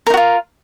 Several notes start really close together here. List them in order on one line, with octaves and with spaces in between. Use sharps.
A#4 D#4 F#4 F4